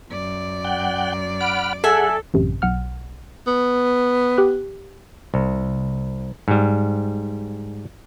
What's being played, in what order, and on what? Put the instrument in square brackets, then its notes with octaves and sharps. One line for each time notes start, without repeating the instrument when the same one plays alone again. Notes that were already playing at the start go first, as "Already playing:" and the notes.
[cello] F#2 D5
[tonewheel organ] F#5 G5
[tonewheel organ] F#5 B5 F6 [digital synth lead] D7
[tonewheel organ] G#4 F#5 [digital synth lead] A4 [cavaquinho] E5 G#5
[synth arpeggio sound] A1 F#2 C3
B1 F#5 F6
[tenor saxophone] B3
[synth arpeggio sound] G4 F#6
[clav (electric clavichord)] C2
G#2 G3